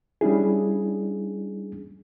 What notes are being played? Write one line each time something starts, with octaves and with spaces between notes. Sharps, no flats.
G3 C#4 D4 E4 G#4